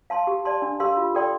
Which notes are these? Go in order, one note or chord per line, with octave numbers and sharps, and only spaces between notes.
F5 A5 C6
G4
D5 A5 C6
D4
G4 A#4 F5 C6
F4
A4 D5 G5 C6